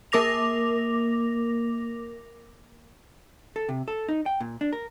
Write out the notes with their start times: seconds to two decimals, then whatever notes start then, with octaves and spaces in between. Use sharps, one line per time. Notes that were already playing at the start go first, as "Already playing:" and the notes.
0.12 A#3 A#4 D6 A#6 F7
3.56 A4
3.69 C3
3.88 A4
4.09 D#4
4.26 G5
4.40 A#2
4.61 D4
4.73 A#4